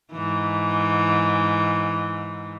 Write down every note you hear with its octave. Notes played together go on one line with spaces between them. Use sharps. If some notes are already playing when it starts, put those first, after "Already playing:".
G#2 E3